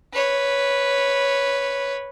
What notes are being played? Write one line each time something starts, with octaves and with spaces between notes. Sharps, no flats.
B4 C#5